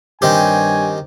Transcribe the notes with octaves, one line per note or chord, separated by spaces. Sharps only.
G2 D#3 C4 G4 C#5 G#5